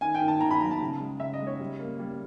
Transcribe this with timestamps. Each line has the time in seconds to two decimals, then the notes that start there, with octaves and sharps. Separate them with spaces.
0.01 D#3 G#5
0.15 G5
0.21 D#3
0.28 A5
0.41 D#3 A#5
0.51 B5
0.61 F#3 A#5
0.71 A5
0.81 C#3
1.00 G#3
1.20 C#3 E5
1.34 D#5
1.40 G#3
1.47 C#5
1.60 G3
1.80 A#3
1.99 G3